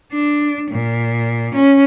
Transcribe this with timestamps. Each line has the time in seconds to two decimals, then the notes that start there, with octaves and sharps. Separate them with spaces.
0.13 D4
0.71 A#2
1.54 C#4